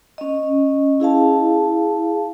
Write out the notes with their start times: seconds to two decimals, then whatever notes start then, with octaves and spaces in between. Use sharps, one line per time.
0.18 C#4 D#5
1.00 E4 G#4 F5 A5